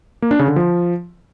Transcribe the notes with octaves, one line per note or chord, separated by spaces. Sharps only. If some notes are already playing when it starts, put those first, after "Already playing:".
A#3
D4
C#3
D3
F3